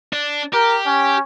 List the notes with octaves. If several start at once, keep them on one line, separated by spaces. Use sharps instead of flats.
D4
G4 A#4
C#4